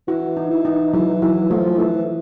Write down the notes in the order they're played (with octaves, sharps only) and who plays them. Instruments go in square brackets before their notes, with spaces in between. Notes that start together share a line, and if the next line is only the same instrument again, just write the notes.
[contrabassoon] E3 [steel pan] F#4
[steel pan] D#4
[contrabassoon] E3
[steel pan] D#4
[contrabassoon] E3 [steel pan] F#3
[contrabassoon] E3 [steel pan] F#3
[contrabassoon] F3 [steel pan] A3
[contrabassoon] E3 [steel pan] A3